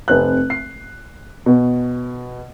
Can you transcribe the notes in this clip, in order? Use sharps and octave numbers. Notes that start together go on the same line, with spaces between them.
F1 C4 F#6
C7
B2